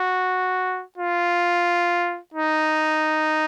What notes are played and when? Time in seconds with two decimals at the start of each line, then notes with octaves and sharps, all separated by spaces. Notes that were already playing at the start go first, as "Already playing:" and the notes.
Already playing: F#4
0.98 F4
2.34 D#4